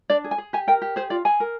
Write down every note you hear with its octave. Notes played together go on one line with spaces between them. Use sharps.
D4 D5
G#4
G#5
G#4
G4 G#5
A#4 G5
G4
G#4 C5
F4 D5
G#4 G#5
A#4